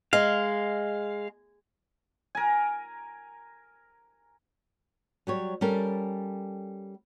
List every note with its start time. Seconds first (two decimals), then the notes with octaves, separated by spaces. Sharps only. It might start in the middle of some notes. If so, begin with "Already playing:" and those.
0.13 G#3 F5
2.35 A#4 G#5
5.27 F#3 G3 C#5
5.61 G3 C#4 A4 A#4